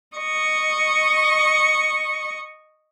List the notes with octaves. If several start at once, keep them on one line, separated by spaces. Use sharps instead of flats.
D#5 C#6